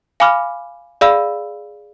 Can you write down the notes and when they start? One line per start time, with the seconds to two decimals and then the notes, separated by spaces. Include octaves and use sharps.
0.20 F5 G#5 B5 D6 F6
1.01 G#4 D5 F5 B5 E6